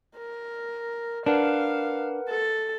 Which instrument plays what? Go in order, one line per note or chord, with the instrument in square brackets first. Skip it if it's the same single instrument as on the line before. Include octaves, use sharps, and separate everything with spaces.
[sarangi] A#4
[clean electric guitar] D4 [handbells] A#4 B4 F#5 [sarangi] F5
[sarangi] A4